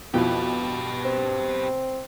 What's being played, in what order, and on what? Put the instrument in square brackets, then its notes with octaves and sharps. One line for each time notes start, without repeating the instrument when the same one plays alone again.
[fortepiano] F2 E4 [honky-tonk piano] B2 [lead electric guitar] G4 B4
[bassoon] C4